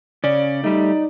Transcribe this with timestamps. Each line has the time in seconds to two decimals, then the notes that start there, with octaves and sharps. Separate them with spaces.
0.24 C#3 C#4 D5
0.64 G3 A3 D#4